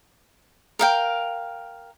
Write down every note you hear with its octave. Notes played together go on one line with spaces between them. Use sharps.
A#4 F5 G5